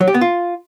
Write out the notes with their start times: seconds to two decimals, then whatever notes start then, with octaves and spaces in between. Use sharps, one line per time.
0.01 F#3
0.07 G4
0.14 B3
0.21 F4